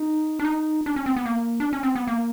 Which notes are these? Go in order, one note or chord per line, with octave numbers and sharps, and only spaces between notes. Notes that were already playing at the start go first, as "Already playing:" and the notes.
Already playing: D#4
D4
D#4
D4
C#4
C4
B3
A#3
D4
C#4
C4
B3
A#3